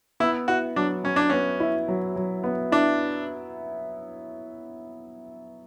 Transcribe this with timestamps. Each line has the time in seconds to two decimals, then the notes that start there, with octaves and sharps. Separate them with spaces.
0.20 B3 E4
0.48 E4 F#4
0.76 F#3 D4
1.04 F#3 C#4
1.16 D4
1.30 B3 C#4
1.60 E4
1.88 F#3
2.16 F#3
2.44 B3
2.72 D4 E4